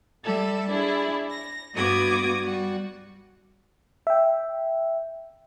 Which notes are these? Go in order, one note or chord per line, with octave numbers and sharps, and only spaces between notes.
G3 A4 E5
D4 E4 G#4
A#6
G2 B3 F#4 D6 D#6 G#6
G3 F#4
E5 G5